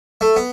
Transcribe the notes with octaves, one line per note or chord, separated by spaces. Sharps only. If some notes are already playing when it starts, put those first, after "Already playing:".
A3
B3